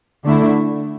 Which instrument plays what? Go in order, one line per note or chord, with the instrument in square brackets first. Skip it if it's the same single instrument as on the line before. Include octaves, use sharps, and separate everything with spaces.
[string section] D3 A3 E4